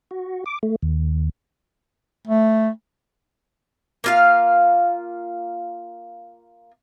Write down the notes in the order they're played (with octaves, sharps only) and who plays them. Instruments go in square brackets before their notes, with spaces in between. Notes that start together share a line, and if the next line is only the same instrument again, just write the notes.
[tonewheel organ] F#4
D6
A3
D#2
[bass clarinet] A3
[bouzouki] A#3 F4 F5